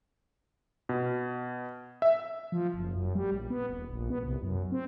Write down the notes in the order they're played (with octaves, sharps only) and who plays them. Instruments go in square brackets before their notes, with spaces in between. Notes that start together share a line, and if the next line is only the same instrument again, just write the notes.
[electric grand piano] B2
E5
[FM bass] F3
F#1
F#2
G3
A#1
B3
D#1
A#1
B3
C2
F#2
C4